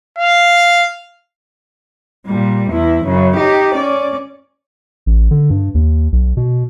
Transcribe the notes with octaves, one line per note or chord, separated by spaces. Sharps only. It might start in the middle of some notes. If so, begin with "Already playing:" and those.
F5
A#2 G3
E2 E4
F#2 C#3
D#4 G4
C#4 D5
A1
D3
G2
D#2
B1
B2